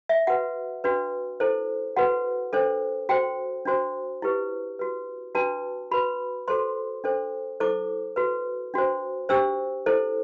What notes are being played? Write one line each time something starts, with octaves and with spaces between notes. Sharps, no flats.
E5
F#4 B4 F#5
D4 F#4 B4
E4 A4 C5
F#4 B4 F#5
D4 A4 C5
F#4 C5 G5
D4 F#4 C5
E4 G4 B4
F#4 B4
D4 F#4 B4 A5
F#4 B4 B5
F#4 A4 C5 C6
D4 A4 C5
E4 A4 C5 D6
F#4 B4
D4 F#4 C5
D4 G4 C5 E6
E4 A4 C5